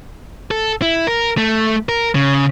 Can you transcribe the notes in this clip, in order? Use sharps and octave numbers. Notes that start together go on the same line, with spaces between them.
A4
E4
A#4
A3
A#4
C#3